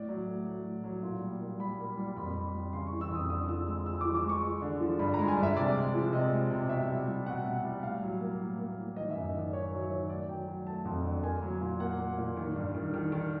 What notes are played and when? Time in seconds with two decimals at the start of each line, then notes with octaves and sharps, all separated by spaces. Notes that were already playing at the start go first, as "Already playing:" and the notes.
Already playing: A2 D5
0.09 F#3
0.28 A3
0.46 F#3
0.65 A2
0.84 F#3
1.03 A#2
1.21 G3
1.41 A#2
1.59 G3 B5
1.79 A#3
1.97 G3
2.17 F2 B5
2.36 G3
2.54 G3
2.73 C#3 C6
2.87 C#6
2.92 E3
3.01 E6
3.11 F2 D#6
3.30 D3 D#6
3.48 F3 E6
3.67 G#3 E6
3.86 G#3 E6
4.01 D6
4.05 F3
4.15 D6
4.24 G#3
4.29 C#6
4.43 G#3
4.62 D3
4.81 F3
4.99 G2 B5
5.14 A#5
5.19 G#3
5.28 G#5
5.37 G2
5.43 E5
5.57 C3 D5
5.76 G#3
5.94 F3
6.13 C3 D#5
6.32 G#3
6.51 C3
6.69 B2 E5
6.89 G3
7.08 G3
7.26 B2 F#5
7.45 B2
7.64 G3
7.83 A2 F5
8.02 F#3
8.21 A#3
8.39 A2
8.58 A#3
8.78 A2
8.96 D#3 D#5
9.11 E5
9.15 F#2
9.25 D#5
9.34 D#3 D5
9.53 D#3 C#5
9.72 F#3 C#5
9.91 D#3 C#5
10.09 A3 D5
10.29 F#3 G5
10.48 F#3
10.67 A3 A5
10.85 F2
11.04 D3
11.23 A#3 G#5
11.42 F#3
11.61 A#2
11.80 A#3 F#5
11.99 A#3
12.18 A#2
12.37 D#3
12.56 G2
12.75 D#3
12.94 D#3
13.12 D#3